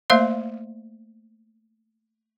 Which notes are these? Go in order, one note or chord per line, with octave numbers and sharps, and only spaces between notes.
A3 A#3 C5 E5 F5 C6